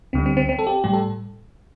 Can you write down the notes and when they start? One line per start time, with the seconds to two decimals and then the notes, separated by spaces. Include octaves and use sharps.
0.13 D2 D3 G3 C4
0.26 C4
0.37 C4
0.49 C4
0.59 A4
0.67 G4
0.84 A2 G3 G4
0.93 A4